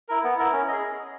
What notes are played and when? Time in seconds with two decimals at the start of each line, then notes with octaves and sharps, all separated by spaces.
0.08 E4 A#4
0.24 B3
0.38 E4 A#4
0.53 C#4
0.68 G#4 D#5